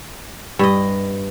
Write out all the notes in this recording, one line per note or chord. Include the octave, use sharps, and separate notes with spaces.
G2 D#5